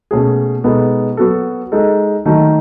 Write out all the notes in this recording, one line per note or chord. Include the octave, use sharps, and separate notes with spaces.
B2 A3 C#4 G#4
B2 G#3 B3 D#4 A4
F#3 B3 F#4 A4
G#3 D#4 A4
D#3 F#3 A3 D#4